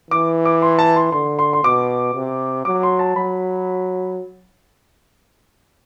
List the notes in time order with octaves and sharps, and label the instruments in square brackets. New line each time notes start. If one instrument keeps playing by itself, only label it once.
[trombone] E3 [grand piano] D6
[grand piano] D6
C6
A5
C6
[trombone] D3 [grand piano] C6
[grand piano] C6
C6
[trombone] B2 [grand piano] D6
[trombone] C3
[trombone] F#3 [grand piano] D6
[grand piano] C6
A5
[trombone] F#3 [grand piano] B5